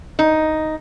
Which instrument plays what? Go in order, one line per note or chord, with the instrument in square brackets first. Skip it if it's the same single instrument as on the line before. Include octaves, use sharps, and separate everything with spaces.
[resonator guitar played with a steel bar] D#4